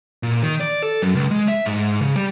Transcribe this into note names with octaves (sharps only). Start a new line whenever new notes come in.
A#2
D#3
D5
A4
F#2
C#2
G#3
E5
G#2
C#3
G3